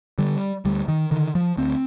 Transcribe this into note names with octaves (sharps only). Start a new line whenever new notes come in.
D3 G3
D2 G3
D#3
D3 D#3
F3
D2 C4